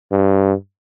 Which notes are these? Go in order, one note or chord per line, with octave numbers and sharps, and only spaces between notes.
G2